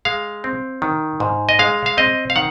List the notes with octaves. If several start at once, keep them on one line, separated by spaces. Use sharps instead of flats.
G#3 F5
C4
D#3
G#2
D#5
G#3 F5
F5
C4 D#5
F5
D#3 F#5